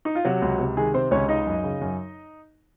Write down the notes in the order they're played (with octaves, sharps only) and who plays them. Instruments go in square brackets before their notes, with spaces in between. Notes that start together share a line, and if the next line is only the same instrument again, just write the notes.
[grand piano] D#4
F4
C3 F#3 F#4
C#2
C3
D#3 G#3 G#4
C3 C4 C5
C#2 C#4 C#5
C#3 D#4 D#5
F#2
C#3
F#2